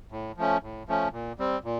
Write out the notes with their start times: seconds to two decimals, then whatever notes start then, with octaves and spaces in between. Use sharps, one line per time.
0.12 A2
0.37 F3 A3 C#4
0.63 A2
0.88 F3 A3 C#4
1.12 A#2
1.39 G3 C4
1.64 A#2